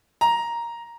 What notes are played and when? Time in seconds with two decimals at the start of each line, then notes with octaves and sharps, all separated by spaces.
0.21 A#5